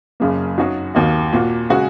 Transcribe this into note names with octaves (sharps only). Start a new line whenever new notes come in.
F#1 F#2 C#3 A#3
F#2 F#3 D#4 F#4
D#2 D#3 A#3 D#4 F#4
A#2 A#3 F#4
C#3 G#3 F#4